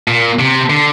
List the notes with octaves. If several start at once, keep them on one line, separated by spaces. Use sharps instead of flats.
A#2
C3
D3